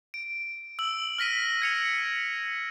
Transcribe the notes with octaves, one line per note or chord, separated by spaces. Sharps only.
D7
E6 F#7
F6 A#6 B6 D#7
G#6 C#7 F7